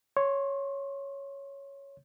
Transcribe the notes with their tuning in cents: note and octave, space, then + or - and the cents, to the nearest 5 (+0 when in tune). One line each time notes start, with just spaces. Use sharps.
C#5 +0 C6 +25